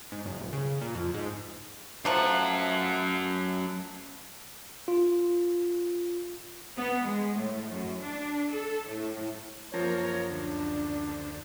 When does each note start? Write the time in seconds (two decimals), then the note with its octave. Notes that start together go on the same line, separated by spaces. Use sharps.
0.12 G#2
0.25 F#1
0.39 D#1
0.52 C#3
0.81 A#2
0.95 F2
1.14 G#2
2.05 F#2 F3 F#3 A3 F#5
4.88 F4
6.77 B3
7.07 G#3
7.36 A2
7.70 F#2
8.02 D4
8.51 A4
8.89 A2
9.74 F#2 F3 A#3 A#4 C#5
10.30 D2 D4